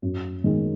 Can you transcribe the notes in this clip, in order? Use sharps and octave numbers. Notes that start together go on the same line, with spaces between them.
F#2
D#3 G#3